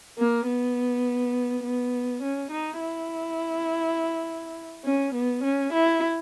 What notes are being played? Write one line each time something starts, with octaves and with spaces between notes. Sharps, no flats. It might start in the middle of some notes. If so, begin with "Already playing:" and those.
A#3
B3
B3
C#4
D#4
E4
C#4
B3
C#4
E4